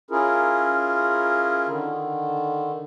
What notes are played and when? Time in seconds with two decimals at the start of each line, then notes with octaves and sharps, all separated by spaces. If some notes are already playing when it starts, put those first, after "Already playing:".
0.11 C#4 E4 F4 G#4 A#4
1.68 D3 D#3